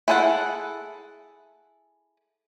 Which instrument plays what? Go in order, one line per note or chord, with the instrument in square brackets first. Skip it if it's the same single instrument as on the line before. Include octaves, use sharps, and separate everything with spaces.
[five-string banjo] E4 G#4 A4 C#5 F#5